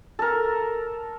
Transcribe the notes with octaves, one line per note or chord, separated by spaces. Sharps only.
A4 A#4